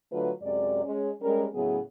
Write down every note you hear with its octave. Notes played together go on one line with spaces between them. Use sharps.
D3 F#3 A3 F4 B4
F#2 C3 G#3 D5
G#3 C#4
G3 G#3 C#4 G4 A#4
A2 C#3 F#3 B3 E4 G#4